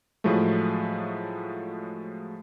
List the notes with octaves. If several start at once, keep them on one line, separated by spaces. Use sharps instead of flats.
A2 F3 F#3 G#3 A3